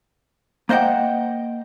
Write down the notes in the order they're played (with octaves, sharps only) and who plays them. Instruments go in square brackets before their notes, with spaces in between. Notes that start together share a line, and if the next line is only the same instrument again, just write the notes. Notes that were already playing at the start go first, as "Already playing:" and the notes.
[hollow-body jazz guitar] A#3 C5 D#5 F#5 G5